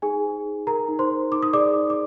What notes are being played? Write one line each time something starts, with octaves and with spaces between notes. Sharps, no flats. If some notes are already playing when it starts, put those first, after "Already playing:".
D#4 G#4 G#5
C5
D#4
G#4 A#4 A#5
D#4
C5 C6
C5
D#4 D6
D#6
G#4 D5 D6
D#4
D6